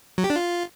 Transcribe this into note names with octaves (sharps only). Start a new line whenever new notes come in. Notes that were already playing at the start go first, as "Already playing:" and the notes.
F#3
G4
D4
F4